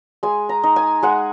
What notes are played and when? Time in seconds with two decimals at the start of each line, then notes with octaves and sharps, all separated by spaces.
0.23 G#3 G#5
0.49 A#5
0.64 D#4
0.76 G#5
1.03 G#3 F#5